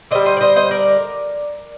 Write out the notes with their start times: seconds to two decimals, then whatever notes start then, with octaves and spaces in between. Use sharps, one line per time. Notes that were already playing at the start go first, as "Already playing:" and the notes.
0.11 D3 G3 C5 D#5
0.26 C5 D#5
0.37 D5
0.41 C5 D#5
0.56 C5 D#5
0.71 A#4 D5